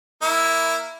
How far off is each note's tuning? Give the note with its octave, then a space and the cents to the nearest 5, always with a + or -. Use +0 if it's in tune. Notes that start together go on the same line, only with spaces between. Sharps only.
A#3 -5 E4 +0